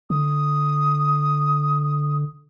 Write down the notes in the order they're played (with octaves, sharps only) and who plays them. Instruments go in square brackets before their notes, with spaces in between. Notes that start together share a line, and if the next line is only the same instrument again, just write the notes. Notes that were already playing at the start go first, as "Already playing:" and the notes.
[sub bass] D3 [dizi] D#6